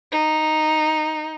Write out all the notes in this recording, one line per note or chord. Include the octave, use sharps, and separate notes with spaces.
D#4